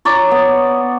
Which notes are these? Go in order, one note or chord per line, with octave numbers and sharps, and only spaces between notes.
C#5 D5 A#5
B3